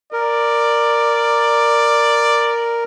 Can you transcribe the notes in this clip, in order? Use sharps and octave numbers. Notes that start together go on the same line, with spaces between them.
A#4 D5